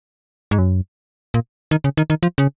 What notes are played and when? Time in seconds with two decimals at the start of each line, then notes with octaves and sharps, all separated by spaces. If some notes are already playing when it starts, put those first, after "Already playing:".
0.51 G#2
0.58 F#2
1.34 A#2
1.71 D#3
1.84 C#3
1.97 D#3
2.10 D#3
2.23 F3
2.38 C#3